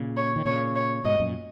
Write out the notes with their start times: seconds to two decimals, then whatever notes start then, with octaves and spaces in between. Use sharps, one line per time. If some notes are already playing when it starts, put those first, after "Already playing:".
Already playing: A#2 C#3
0.17 C#5
0.36 D#3
0.45 A#2 C#3 C#5
0.76 C#5
1.05 G#2 B2 D#5
1.20 F#2 A#2